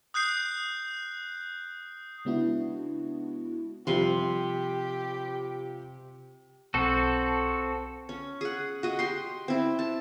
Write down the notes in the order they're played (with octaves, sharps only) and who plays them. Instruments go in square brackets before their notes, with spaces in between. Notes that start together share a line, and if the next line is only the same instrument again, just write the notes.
[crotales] D#6 F#6 G6 C7
[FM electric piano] C#3 G#3 B3 D4 E4 F#4
[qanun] C3 C6 [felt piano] F3 G3 [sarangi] G4
[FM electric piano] B1 [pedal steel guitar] C4 F#4 A4
[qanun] C#4
G#4 F#5
F#4 D#5
G4 C6
C4 E4
A5